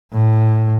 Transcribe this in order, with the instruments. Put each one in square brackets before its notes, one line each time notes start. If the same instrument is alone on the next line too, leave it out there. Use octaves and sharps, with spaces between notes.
[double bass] A2